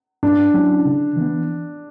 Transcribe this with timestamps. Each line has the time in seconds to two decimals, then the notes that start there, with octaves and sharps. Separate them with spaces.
0.23 G2 D4
0.54 F#3 C#4 E4
0.85 C#3
1.16 E3 B3